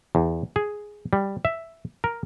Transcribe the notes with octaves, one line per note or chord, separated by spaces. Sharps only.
E2
G#4
G3
E5
A#4